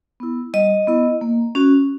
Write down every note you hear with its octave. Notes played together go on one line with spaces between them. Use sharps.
B3 E4
G3 D#5
B3 E4
A#3
C#4 F#4